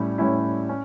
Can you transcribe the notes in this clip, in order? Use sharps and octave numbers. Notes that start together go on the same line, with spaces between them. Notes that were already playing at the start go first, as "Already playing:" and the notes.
Already playing: A2 G3 C#4 E4
A2 G3 C#4 E4
C#4